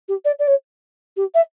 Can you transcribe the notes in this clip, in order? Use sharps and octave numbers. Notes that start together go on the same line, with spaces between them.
G4
D5
D5
C#5
G4
E5